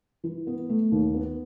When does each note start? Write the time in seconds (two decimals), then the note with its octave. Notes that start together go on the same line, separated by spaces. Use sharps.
0.24 E3
0.47 B3
0.69 A3
0.92 D#2
1.14 B3